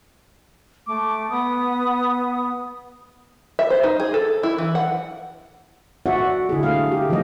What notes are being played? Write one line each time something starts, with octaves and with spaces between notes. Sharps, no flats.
A3 D6
B3 D#6
E5
C5
D#4
G#4
A4
E4
E3
F#5
F#4 D5 E5 F#5
D3 E4 G#4
A3 F5
G4
D#3 F3 F#3 A3 D#5